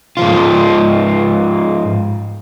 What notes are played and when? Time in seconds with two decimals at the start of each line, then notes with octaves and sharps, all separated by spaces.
0.17 G#2 F3 F4